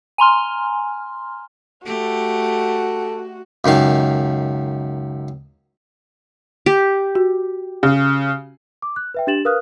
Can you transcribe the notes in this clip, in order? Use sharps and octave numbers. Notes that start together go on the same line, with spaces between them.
G#5 A#5 C6 F6
A3 F#4 G4 A4
C#2 F#2 D#3 F5
G4
F#4
C#3
D6
F#6
B4 E5 G5
D4 G4 A6 E7 F#7
A#4 B4 F5 D#6 F6 F#6